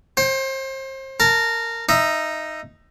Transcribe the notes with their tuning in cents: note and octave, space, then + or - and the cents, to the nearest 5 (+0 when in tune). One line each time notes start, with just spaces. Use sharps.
C5 +35 G5 +0
A#4 -15 A5 +0
D#4 +0 E5 +20